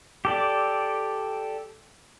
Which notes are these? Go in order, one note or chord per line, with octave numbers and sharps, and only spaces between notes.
G4 A4 D5